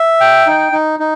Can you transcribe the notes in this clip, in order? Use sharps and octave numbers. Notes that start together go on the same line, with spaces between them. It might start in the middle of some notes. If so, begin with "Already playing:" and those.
Already playing: E5
G5
D#4
D#4
D#4